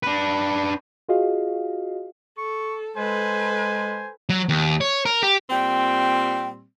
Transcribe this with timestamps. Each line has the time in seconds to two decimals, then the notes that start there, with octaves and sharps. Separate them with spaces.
0.03 D4 B4
1.09 F4 F#4 G#4 D#5 F5
2.38 A4 C#6
2.97 G#3 A4 B4 C5 G#5
4.29 F#3
4.49 D#2
4.81 C#5
5.06 A#4
5.23 G4
5.50 A#2 G3 C4 G5